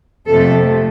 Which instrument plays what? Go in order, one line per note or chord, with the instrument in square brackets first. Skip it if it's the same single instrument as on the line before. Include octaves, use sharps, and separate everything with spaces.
[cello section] F2 C3 F3 A3 A4